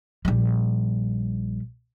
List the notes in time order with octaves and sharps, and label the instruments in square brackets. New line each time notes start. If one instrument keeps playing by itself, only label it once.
[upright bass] A#1 G3